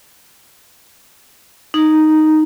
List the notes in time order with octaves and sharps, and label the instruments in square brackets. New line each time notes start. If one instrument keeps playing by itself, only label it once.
[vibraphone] D#4